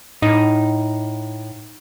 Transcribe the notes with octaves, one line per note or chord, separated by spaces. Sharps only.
A2 D#4